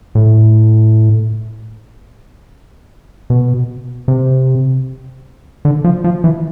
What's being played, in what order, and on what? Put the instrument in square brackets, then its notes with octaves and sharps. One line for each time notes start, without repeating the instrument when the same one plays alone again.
[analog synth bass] A2
B2
C3
D3
F3
F3
E3